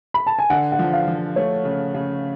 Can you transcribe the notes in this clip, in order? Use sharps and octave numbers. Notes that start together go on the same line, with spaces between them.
B5
A5
G#5
D3 F#5
F#5
F3
F5
F3
A3 C#5
C#3
C#3